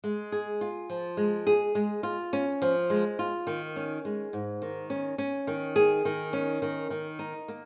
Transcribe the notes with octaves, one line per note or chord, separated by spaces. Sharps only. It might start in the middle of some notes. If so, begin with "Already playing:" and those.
G#3
G#4
F4
F3
G#3
G#4
G#3
F4
C#4
F3
G#3
F4
D#3
C#4
G#3
G#2
D#3
C#4
C#4
D#3
G#4
D#3
C#4
D#3
D#3
D#4
A#3